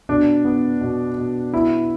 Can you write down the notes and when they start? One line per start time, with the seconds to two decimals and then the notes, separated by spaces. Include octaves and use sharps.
0.09 B2 D4
0.45 B3
0.81 B2
1.18 B2
1.53 B3 E4